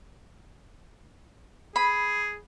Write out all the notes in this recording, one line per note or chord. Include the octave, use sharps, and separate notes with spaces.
G#4 B5